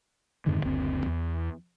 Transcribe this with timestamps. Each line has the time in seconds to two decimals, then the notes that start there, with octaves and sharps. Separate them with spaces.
0.46 F2 G#2 D3 D#3
0.63 F#1 D2 C4
1.06 E2